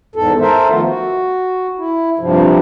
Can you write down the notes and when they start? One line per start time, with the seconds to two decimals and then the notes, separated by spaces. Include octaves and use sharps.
0.16 E2 G#2 A4
0.40 A4 A#4 C5 E5
0.69 D#3 F3 A3 B3 F4
0.87 F#4
1.78 E4
2.19 G2 C3 F3